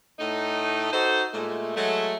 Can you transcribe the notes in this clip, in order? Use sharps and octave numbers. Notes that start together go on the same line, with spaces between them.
A2 A3 D#4
D#4 F#4 A4 C5
A#2 G#3 A3
F#3 G#3 A3